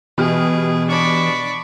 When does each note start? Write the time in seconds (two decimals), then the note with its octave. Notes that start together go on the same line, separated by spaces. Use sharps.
0.18 B2 E3 G4 G#4 F6
0.88 D4 D5 B5 C#6